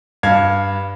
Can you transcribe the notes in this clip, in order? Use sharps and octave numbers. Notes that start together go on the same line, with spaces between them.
G2 F5 G#6